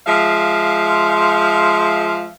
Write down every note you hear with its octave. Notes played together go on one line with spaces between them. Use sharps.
F3 G#3 E5 F5